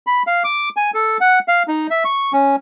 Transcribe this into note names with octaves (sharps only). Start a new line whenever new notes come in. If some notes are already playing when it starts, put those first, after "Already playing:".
B5
F5
D6
G#5
A4
F#5
F5
D#4
E5
C#6
C#4